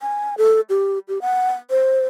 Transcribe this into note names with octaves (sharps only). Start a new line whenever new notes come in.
G#5
A4
G4
G4
F#5
C5